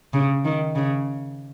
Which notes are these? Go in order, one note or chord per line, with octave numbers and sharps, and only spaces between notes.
C#3
D#3
C#3